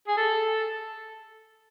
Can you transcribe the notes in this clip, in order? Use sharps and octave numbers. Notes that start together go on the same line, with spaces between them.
G#4
A4